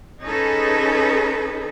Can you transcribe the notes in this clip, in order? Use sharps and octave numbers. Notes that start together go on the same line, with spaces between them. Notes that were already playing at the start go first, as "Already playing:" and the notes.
C#4 D#4 G#4 A4 B4